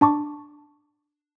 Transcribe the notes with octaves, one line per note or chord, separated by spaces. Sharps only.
D4 A5 C#6 D6